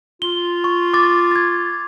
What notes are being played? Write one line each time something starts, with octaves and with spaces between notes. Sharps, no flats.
F4 G7
C#6
D6 A6
G#6 A6